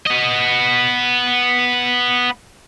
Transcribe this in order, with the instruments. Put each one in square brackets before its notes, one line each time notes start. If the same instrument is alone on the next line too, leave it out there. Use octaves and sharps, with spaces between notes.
[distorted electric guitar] B3 D#5